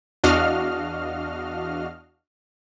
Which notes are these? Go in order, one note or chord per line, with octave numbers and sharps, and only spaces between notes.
E2 D4 F#4 D#5 F5 F6